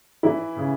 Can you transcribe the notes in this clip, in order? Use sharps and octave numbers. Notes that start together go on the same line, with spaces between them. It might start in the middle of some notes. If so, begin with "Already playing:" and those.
E3 E4
C#3